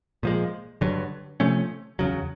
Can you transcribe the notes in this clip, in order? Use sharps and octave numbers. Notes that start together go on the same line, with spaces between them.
A#2 F3 G#3
G2 D3 F#3
C3 F3 A3 C#4
E2 C#3 F#3